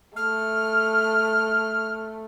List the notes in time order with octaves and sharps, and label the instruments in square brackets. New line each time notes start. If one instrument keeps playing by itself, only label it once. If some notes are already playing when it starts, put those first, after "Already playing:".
[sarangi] A3 [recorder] F6